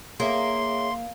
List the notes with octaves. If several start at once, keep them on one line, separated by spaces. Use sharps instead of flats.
A#3 G#4 C#5 E5 C6